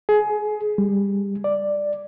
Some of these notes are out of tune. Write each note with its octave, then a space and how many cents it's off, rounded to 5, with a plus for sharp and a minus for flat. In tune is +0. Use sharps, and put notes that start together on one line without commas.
G#4 +20
G3 +25
D5 +5